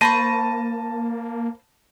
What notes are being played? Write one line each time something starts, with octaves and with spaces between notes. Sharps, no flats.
A#3 C5 A5 B5 C#6 A#6 D#7